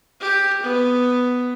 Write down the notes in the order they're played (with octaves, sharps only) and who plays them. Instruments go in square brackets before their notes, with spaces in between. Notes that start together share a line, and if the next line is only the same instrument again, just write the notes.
[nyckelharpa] G4
B3